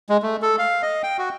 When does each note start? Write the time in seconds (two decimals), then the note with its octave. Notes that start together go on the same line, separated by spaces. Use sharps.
0.09 G#3
0.23 A3
0.42 A4
0.59 F5
0.83 D#5
1.03 G5
1.18 F#4